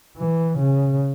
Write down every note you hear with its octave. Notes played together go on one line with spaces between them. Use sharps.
E3
C#3